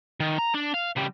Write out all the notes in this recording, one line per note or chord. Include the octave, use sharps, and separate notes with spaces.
D#3
A#5
D4
F5
C#3 G3